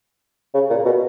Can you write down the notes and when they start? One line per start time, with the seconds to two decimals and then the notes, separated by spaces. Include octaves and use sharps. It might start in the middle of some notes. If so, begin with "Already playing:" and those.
0.54 C#3
0.70 A#2
0.85 B2